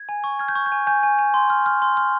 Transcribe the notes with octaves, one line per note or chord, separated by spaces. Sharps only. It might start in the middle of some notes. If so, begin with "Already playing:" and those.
Already playing: G#6
G#5
C#6
F6 G#6
G6
C#6
G6
G#5
G#5 G6
G#5
G#5
C6
F6
F6
C6
F6